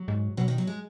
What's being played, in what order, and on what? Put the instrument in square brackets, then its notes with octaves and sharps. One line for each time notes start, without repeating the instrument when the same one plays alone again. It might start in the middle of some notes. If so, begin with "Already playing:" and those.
Already playing: [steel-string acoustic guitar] F#3
[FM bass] G#2
[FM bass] B2 [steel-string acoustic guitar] F#3
[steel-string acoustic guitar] D#3
F#3
G#3